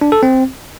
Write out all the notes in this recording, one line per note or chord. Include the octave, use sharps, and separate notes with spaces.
D4
A4
C4